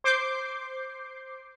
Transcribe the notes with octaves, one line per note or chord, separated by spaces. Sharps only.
C5 D6 G6 C7